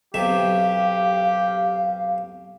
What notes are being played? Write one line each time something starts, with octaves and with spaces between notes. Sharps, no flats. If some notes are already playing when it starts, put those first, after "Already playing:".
B1 C3 G4 E5 F5